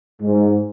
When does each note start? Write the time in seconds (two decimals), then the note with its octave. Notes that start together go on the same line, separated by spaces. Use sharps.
0.21 G#2